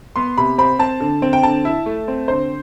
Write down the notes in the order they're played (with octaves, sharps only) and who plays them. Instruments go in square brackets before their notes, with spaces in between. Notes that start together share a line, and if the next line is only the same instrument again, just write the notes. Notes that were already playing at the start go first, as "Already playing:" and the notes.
[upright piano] B3 C6
C3 B5
C4 B5
C4 A5
D3
C4
G5
D3 A5
E4
A3
C4
D3 C5